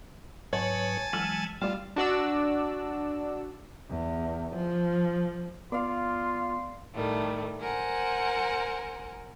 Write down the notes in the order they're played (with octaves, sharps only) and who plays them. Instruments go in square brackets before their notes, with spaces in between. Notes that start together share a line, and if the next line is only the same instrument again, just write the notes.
[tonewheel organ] G#2 F#3 B4 [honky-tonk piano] C#5 [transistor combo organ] G#5 A5
[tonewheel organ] E3 F#3 G#3 [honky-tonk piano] E6 F6 F#7
[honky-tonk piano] G3 D5 [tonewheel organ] A3 [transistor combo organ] F4
[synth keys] D4 F#4 D5 E6
[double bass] E2
F3
[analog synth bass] B3 [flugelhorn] F4 [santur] D5 F5 [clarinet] C6
[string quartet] A2 D#3 G3 A3
A#4 C5 F#5 G#5